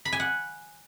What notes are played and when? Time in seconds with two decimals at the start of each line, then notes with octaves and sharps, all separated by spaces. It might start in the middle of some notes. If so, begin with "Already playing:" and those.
0.05 B5
0.12 G#5
0.20 F#5